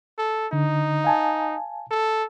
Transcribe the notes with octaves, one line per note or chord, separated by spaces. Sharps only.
A4
D3 D#4
F5 G#5 A5
A4